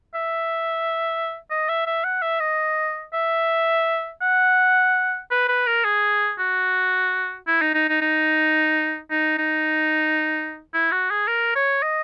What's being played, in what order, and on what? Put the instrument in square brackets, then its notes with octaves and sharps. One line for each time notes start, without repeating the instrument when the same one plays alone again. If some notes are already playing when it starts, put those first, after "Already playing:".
[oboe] E5
D#5
E5
E5
F#5
E5
D#5
E5
F#5
B4
B4
A#4
G#4
F#4
E4
D#4
D#4
D#4
D#4
D#4
D#4
E4
F#4
G#4
A#4
C#5
D#5